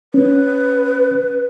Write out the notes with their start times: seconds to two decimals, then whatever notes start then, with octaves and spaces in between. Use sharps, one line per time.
0.14 C#4 B4